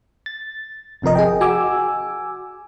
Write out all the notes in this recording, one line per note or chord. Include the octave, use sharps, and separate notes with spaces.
A6
G1 C3 F3 A#4 D#5
G#4 D#5 G5
F#4 G#5 D6 E6